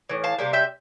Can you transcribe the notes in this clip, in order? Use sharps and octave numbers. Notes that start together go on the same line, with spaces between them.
A2 E3
F5 A5
C3 G3 A#3
E5 G5